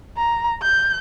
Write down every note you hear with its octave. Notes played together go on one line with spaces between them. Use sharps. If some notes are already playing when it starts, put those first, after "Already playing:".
A#5
G6